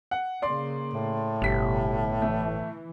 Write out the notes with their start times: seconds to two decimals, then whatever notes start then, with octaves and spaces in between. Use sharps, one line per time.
0.11 F#5
0.42 C#3 A#3 D5 C6
0.93 A2
1.42 G1 B2 D3 G3 B6
2.22 E3 A3